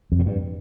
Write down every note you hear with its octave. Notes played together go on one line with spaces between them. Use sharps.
F2
A2
G2